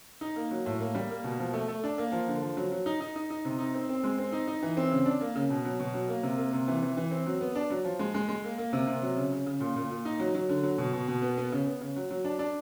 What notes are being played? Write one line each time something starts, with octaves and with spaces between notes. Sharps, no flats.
D#4
A#3
F#3
A2
A#3
G3
A#3
B2
F3
A3
A3
D4
A#3
F3
D3
F3
F#3
F#3
D#4
D#4
D#4
D#4
C3
D#4
C4
C4
G#3
C4
D#4
D#4
E3
C4
C#3
D4
A#3
C#3
B2
F#3
B2
F#3
A#3
C3
A#3
C3
E3
E3
E3
C4
F#3
B3
D4
F#3
F3
G#3
G#3
G#3
A#3
A#3
C3
C3
F#3
C#3
C#3
C#3
A#2
A#2
A#2
D#4
F#3
F#3
D3
F#3
B2
B2
B2
B3
B3
C#3
B3
C#3
F#3
F#3
D4
D4